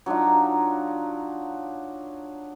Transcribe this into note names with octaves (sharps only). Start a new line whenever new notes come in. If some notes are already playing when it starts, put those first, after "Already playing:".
F#3 D4 D#4 F4